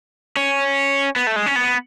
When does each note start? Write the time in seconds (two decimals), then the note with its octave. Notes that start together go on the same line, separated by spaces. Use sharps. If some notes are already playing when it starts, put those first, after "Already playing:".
0.37 C#4
1.16 B3
1.27 A3
1.36 G#3
1.46 C#4
1.56 B3